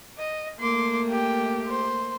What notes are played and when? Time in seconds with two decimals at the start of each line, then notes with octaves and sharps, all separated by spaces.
0.18 D#5
0.60 A3 A#3 C6 D6
1.11 G4 G5
1.67 C5